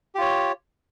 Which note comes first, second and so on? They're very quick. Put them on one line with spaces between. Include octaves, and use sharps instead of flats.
G4 F4 C#5